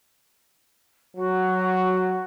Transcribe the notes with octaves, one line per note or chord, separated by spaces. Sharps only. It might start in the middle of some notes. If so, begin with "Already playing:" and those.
F#3 F#4